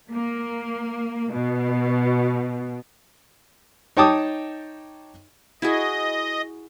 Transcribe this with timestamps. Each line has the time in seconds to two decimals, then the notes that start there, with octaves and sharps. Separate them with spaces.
0.11 A#3
1.31 B2
3.97 D#4 C#5 G5 A5 D6 D#6
5.62 E4 F#4 G#4 D#5